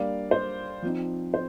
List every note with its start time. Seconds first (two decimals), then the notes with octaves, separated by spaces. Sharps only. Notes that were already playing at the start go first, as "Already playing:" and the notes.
Already playing: G3 A#3 D4 D5 F5
0.31 C5
0.82 F3 C4 D#4
1.34 C5